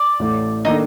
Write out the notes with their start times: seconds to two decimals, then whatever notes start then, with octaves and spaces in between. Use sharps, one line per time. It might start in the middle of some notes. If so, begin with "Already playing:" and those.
Already playing: D5
0.19 A1 A2 A3
0.65 D#3 A#3 D4 D#4 A4